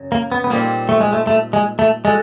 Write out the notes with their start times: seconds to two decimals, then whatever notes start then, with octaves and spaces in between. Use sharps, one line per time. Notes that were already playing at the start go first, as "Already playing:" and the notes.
Already playing: F#2 C#3 F#3
0.12 A#3
0.32 B3
0.44 B3
0.50 A#2 G3 A#3 C4 D#4 G4
0.89 A3
1.00 G#3
1.13 A3
1.27 A3
1.53 G#3
1.79 A3
2.05 G#3 F#4 A4